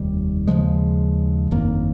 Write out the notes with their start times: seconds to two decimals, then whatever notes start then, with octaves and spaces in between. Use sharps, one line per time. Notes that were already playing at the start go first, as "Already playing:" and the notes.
Already playing: F1 D#2 D#3 G3
0.47 D#2 C#3 F3 G#3
1.51 G1 F2 D#3 A#3